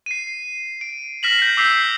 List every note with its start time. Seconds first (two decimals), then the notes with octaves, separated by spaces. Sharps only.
0.06 C7 D#7
0.81 D7
1.23 F6 A#6 B6 E7 F#7
1.39 G6 C7
1.57 D6 E6 G6 B6 C7